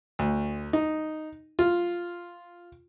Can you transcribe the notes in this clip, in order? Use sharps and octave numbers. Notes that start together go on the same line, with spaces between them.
D2
D#4
F4